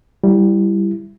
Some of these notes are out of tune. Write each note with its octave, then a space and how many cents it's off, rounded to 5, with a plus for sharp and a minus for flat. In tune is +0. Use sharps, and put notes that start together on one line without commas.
G3 +0 E4 +15